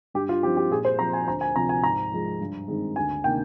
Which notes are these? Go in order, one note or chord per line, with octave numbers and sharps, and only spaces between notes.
G2 G4
F4
F3 C4 D#4 G4
G4
A#2 G#4
C5
F3 C4 A#5
G#5
D2 A#5
G#5
C3 F3 C4 A#5
G#5
G#2 A#5
F3 G#3
G2
D#3 G#3 C4
D2 G#5
C3 D#3 A#3 D4 G5